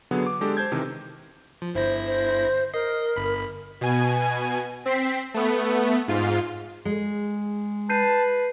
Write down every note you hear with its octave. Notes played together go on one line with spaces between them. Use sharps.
D3 F#3 B3 G#4
D6
G#3 D4 G4 A4
C5 A5 G6 G#6
C3 D#3 E3
F3
G1 E4 C5 A#6
C5
A#4 D#5 C7
G1 B5
B2 G#5
C4 B6 C7
A3 B3
G#2 F4
G#3
B4 A5 G6 C7 D#7